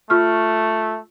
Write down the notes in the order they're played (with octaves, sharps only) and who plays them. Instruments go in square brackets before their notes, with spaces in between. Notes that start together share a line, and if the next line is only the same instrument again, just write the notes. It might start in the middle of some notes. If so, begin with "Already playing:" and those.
[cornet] A3 [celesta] F4 C#6 F6